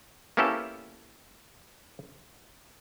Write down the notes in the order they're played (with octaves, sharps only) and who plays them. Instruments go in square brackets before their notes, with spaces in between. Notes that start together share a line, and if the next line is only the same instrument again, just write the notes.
[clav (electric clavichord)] A#3 B3 C#4 E4 G4 A4